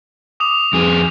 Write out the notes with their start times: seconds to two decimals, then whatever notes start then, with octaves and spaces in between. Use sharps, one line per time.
0.40 D6 D#6 F7
0.73 F2 G#4